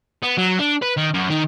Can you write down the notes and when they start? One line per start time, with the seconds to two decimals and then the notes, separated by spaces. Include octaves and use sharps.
0.23 B3
0.37 F#3
0.59 D4
0.82 B4
0.97 D#3
1.14 F#2
1.30 D#3